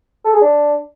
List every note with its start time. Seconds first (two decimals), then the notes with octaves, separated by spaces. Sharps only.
0.25 A4
0.33 G#4
0.41 D4